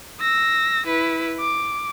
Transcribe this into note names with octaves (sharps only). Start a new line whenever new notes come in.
E6 A#6
E4 B4
D6